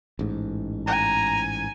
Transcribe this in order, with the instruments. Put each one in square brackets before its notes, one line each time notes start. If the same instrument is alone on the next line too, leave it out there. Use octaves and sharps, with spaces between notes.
[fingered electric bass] A1 G#2
[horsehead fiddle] G#5 [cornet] A#5